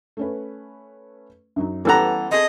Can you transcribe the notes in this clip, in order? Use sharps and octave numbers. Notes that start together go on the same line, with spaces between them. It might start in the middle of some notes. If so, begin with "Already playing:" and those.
A3 C#4 B4
F#2 F#3 D#4
E3 G3 B3 C#4 G4 A4 F#5 A#5
C4 G#4 A4 D#5